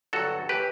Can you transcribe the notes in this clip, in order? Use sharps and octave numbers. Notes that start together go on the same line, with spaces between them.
G1 G2 D3 F#3 F#4 A4
A2 E3 G4 B4